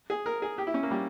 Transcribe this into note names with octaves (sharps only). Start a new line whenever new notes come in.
G#4
A#4
G#4
G4
E4
C#4
A#3
G3